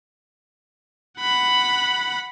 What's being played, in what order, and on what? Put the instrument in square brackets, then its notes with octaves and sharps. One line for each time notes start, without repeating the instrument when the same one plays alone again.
[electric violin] F#5 B5